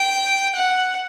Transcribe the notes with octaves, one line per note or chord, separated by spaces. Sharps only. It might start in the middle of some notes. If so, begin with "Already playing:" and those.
Already playing: G5
F#5